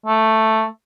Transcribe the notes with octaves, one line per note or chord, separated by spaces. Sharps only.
A3